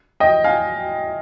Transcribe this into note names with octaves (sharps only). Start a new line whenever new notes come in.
D#5 G5
F5 G#5